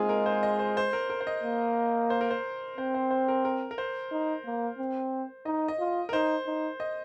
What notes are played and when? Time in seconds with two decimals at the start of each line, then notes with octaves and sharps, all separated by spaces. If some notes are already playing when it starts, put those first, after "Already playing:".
Already playing: G#3 A#3 C4 D#4 F4 G#4
0.09 A#4
0.26 C5
0.43 D#5
0.59 C5
0.77 C5
0.93 A#4
1.10 A#4
1.21 C5
1.27 D#5
1.43 A#3
2.10 C5
2.21 A#4
2.31 C5
2.78 C4 C5
2.94 C5
3.11 C5
3.28 A#4
3.45 A#4
3.71 A#4
3.78 C5
4.12 D#4
4.46 A#3
4.79 C4
5.46 D#4 D#5
5.68 D#5
5.79 F4
6.09 A#4
6.13 D#4 C5
6.47 D#4
6.80 D#5